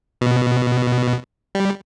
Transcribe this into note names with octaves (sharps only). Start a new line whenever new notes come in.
B2
G3